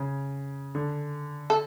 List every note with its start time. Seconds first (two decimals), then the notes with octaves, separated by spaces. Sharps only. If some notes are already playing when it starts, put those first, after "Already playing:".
Already playing: C#3
0.75 D3
1.50 A4